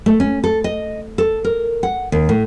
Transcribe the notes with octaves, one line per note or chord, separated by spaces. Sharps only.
A3
C#4
A4
D#5
A4
A#4
F#5
D#2
A2